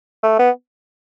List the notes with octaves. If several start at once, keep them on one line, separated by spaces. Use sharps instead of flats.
A3
B3